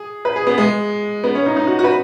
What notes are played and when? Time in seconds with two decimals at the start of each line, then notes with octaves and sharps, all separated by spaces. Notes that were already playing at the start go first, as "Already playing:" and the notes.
Already playing: G#4
0.25 B4
0.36 G#4
0.47 B3
0.58 G#3
1.24 B3
1.35 C#4
1.46 D#4
1.56 D#4
1.67 F#4
1.79 F#4
1.84 B4